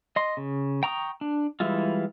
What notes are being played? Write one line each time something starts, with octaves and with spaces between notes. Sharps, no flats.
D#5 C6
C#3
G5 A#5 C#6 D#6
D4
E3 G3 G#3 E4 F4